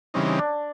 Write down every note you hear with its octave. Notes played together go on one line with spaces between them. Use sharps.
C#3 E3 G3 C4 C#4 D#4
D4